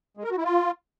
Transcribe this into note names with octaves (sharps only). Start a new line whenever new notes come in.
G#3
A#4
F#4
E4
F4